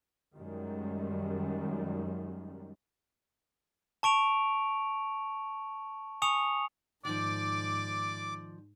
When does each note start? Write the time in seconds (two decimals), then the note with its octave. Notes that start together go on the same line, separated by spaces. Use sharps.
0.36 F#2 D#3 G3 G#3
4.03 A5 C#6 D7 F7
6.22 G#5 C#6 D#6 C#7 F7
7.05 G#2 D#3 F3 D5 D6